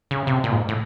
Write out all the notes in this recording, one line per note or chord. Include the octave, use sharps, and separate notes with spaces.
C#3
C3
A#2
G#2
A2